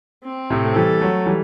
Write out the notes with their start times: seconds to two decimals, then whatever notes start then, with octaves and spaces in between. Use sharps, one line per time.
0.24 C4
0.50 A2 C3
0.65 A3
0.75 E3 G3 A4
1.00 F#3 A3
1.26 E3 G3